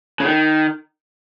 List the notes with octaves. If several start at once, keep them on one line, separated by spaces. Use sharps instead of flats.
C#3
D#3